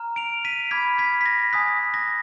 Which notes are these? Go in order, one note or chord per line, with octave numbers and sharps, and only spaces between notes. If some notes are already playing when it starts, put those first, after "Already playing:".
Already playing: A#5 F6
D7 F7
B6 D#7
B5 D6 F6 G#6 B6
G#6 B6
B6
A#6
G#5 D#6 F#6 G#6 B6
A#6